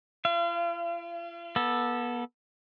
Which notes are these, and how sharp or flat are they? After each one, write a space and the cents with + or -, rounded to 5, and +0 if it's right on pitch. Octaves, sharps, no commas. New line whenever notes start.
F4 -45 F5 -35
B3 -30 A4 +0